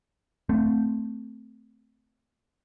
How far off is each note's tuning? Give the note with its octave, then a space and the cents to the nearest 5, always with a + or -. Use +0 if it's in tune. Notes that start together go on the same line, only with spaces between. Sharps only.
A3 +0 C4 -15